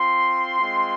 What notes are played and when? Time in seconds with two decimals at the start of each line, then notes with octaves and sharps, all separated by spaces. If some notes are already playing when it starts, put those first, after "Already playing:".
Already playing: C4 F4 C6
0.59 G#3 C4 F4